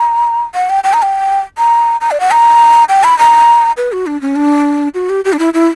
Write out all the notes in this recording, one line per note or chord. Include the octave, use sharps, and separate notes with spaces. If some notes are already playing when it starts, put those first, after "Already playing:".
Already playing: A#5
F#5
G5
G5
A#5
G5
A#5
A#5
D5
F#5
A#5
G5
B5
A#5
B4
F#4
D4
C#4
D4
F#4
G4
G4
D4
E4
E4